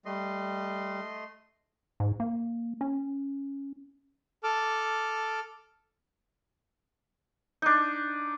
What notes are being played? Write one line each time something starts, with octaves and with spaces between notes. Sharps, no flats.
G3 A3 D#5 C6
G#2
A#3
C#4
A4 A5 D6 F6
D4 D#4